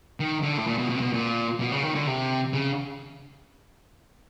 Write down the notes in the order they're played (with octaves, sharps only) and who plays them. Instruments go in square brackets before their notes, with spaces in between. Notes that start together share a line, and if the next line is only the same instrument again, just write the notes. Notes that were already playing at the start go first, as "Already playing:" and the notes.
[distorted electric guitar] D#3
D3
A2
A#2
B2
B2
C3
B2
A#2
B2
C#3
D#3
D3
C3
C#3